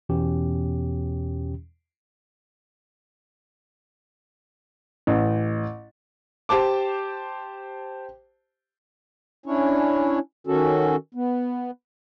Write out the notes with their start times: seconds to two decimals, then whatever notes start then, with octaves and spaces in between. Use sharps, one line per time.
0.09 E2 B2 E3 C#4 G4
5.07 A1
6.49 G4 C5 A5 D6
9.46 C#4 D4 E4 C#5
10.47 D#3 C#4 F#4 A4
11.15 B3